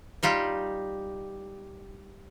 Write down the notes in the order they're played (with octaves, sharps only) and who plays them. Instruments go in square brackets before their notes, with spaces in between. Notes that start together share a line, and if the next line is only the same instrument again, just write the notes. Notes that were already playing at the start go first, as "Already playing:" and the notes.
[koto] G3 D#4 F4 G4